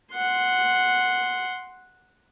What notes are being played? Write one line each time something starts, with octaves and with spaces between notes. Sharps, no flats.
F#5 C6